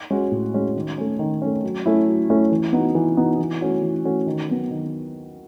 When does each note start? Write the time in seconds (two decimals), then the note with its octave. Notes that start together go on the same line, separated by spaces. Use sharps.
0.10 G#3 C#4 F#4
0.32 A2
0.54 G#3 C#4 F#4
0.76 D#3
0.98 A3 C#4
1.19 D#3
1.42 A3 C#4
1.63 F#3
1.86 A3 C#4 E4
2.07 F#3
2.30 A3 C#4 E4
2.51 E3
2.73 B3 D#4 F#4
2.95 E3
3.17 B3 D#4 F#4
3.38 E3
3.61 A3 C#4 F#4
3.82 E3
4.05 A3 C#4 F#4
4.27 D#3
4.48 F#3 B3
4.71 D#3